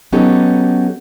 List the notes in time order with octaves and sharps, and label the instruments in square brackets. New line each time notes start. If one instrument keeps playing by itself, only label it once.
[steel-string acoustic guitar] F#3 B3 C#4 D#4 G4 A4